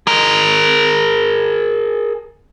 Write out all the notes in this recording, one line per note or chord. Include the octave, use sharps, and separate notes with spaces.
G#4 A#4